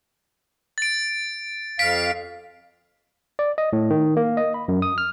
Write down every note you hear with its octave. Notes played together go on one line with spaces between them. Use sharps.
A6 D7
F2 F5 B6 D7
D5
D#5
A2
D#3
A#3
D#5
B5
F#2
D#6
F6